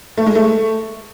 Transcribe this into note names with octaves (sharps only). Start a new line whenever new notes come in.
A3
G#3
A3